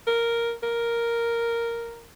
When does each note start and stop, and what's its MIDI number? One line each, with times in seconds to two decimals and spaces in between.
0.07 0.53 70
0.63 2.07 70